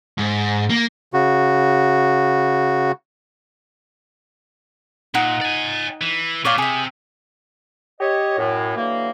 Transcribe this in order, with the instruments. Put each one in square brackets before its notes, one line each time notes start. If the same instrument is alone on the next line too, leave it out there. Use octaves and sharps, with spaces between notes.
[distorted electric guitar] G#2
A#3
[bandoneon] C#3 F#4
[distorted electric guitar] A#2 [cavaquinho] D#4 F#5
[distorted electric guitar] D5 G#5
E3
[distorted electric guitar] A#2 [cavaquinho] C#5 D5 F5
[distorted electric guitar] C3 [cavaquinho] G#4 E5
[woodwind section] G4 C#5 D#5
F#2 A2
D3 E3 F#3 A#3